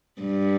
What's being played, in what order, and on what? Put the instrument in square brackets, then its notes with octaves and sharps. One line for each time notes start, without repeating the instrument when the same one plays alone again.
[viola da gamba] G2